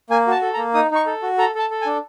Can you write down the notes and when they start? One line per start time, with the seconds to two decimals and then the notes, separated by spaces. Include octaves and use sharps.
0.10 A#3 G#5
0.27 F#4 A5
0.42 A4
0.54 A#5
0.58 A#3
0.74 D#4 D#6
0.91 D#4 C#6
1.06 A4
1.23 F#4
1.38 A4 A#5
1.55 A4 A5
1.70 A4
1.82 G#5
1.86 D4